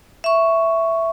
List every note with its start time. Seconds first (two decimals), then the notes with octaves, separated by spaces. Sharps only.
0.24 E5 C#6